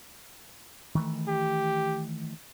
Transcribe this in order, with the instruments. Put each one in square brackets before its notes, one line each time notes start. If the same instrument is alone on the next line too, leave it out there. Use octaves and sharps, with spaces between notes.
[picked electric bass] D#3 E3 A3
[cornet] G4